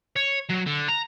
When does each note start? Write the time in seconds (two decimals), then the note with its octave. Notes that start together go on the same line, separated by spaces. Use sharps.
0.16 C#5
0.50 F#3
0.67 D3
0.89 A#5